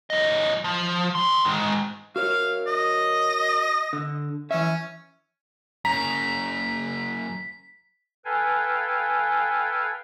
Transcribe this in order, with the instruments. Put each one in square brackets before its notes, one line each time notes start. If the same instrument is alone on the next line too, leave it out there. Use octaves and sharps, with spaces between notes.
[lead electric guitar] F#2 D#5
F3
D#3 C6
G#2 D#3
[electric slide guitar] F#4 A#4 C#5 [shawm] F5
[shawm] D#5
[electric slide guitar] D3
[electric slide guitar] E3 E5 [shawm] C#4
[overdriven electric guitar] F#2 C#3 [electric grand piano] A#5 [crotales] B6
[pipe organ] A4 B4 F5 G5 G#5